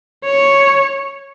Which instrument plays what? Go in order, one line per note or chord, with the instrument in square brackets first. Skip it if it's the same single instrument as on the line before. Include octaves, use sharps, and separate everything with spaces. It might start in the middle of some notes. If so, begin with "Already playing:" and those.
[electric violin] C#5